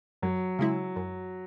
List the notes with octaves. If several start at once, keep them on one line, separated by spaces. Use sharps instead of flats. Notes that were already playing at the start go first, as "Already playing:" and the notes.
F#2 F#3
C#3 G#3 E4
F#2